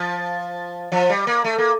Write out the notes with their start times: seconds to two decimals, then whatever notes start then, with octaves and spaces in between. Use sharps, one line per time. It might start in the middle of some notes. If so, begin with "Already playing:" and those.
Already playing: F3
0.92 F3
1.10 G3
1.27 A#3
1.44 A3
1.58 A#3